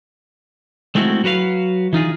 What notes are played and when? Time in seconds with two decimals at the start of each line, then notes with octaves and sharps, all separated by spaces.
0.95 G#3 A3 C4 E4 F#4
1.24 F#3 F#4 B4 F5
1.93 E3 D#4 F4 G#4